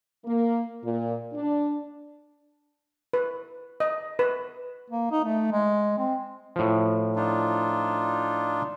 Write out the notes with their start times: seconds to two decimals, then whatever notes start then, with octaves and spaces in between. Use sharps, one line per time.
0.25 A#3
0.83 A#2
1.33 D4
3.13 B4
3.80 D#5
4.19 B4
4.90 A#3
5.11 D#4
5.25 A3
5.52 G#3
5.98 C4
6.56 A2 F3
7.16 D4 D#4 F4